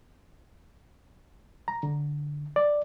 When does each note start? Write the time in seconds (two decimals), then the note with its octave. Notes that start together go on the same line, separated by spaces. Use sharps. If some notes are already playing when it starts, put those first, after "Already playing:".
1.68 A#5
1.83 D3
2.56 D5